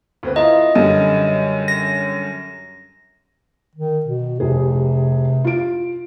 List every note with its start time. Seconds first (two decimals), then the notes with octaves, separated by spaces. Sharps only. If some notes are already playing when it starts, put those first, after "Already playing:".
0.23 D2 C4 B4
0.36 E4 F4 D#5 A#5
0.75 F#2 D3 G3
1.68 A#6
3.75 D#3
4.06 B2
4.40 F1 C3 G#4
5.44 F4 D7